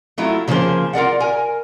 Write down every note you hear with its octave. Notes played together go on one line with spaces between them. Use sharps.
F#3 A3 E4 F4
C#3 F3 A#3 G#4 C5
F4 A#4 D5 F#5
A#4 G#5